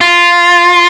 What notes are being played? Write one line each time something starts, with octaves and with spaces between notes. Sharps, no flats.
F4